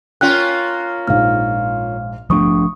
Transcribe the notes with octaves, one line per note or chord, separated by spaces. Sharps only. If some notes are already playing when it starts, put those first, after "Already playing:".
A#3 C#4 F4 G5 F#6
A#1 G#2 F5 F6
F3 A3 D4 C#6 D#6